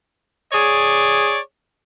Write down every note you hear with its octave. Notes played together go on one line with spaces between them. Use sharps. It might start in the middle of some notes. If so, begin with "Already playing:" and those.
G#4 C#5 D5